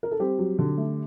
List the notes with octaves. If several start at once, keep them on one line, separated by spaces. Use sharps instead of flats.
A#4
A4
G3 C4 G4
F#3
D3
A3